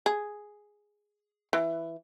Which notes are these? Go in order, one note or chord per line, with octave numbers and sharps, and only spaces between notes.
G#4
E3